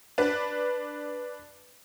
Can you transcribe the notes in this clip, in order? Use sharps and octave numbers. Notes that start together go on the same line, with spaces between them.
D4 B4